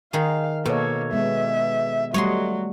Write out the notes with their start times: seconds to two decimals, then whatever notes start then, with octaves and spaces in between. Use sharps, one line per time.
0.13 D#3 G#4 F5
0.66 B2 A#3 A4 C#5
1.13 G#3 B3 E5
2.14 F#3 G3 A3 C#5 D#5 C6